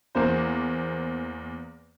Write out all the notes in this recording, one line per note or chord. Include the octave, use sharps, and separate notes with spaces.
E2 A#3 C5